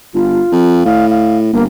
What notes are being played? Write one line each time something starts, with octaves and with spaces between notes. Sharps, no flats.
G1 F4
F2
A2 F5
F5
G1 A#3